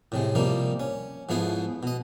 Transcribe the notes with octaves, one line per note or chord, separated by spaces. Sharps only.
A2 C3 G#3
C3 F3 G3 A#3 D#4
C#4
G#2 F3 A3 B3 E4 G#4
B2 D#5